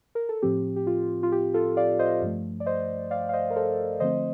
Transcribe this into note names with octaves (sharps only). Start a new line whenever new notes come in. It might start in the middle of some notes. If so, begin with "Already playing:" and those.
A#4
A4
A2 F3 C4 G4
G4
F4
F4
G4
F4 A4
D5 F5
C5 D#5
G2 F3 A3
D5
C5 D#5
D5 F5
F5
C5 D#5
A#4
A4 C5
D3 F3 A3 C4 C5 D#5